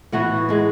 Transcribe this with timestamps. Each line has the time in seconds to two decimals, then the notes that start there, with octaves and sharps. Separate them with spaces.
0.12 A2 E3 B3 F#4 F#5
0.49 A2 G#3 B3